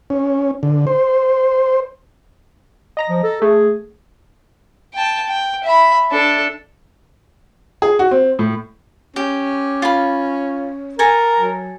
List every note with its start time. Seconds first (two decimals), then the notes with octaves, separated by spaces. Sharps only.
0.10 C#4
0.63 D3
0.87 C5
2.97 D#5 A#5 A#6
3.10 F3
3.24 A4
3.42 A3 G#4
4.94 G5 A5
5.27 G5
5.64 E5 B5
6.11 D4 A4
7.82 G#4
7.99 F#4
8.11 C4
8.39 A2
9.16 C#4 G4
9.82 F4 B5
10.99 A4 A#4 G#5 A#5
11.40 F#3